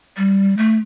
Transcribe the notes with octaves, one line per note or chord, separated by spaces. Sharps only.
G3
A3